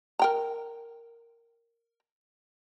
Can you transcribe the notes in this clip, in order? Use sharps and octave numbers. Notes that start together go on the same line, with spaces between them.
A#4 G5 A#5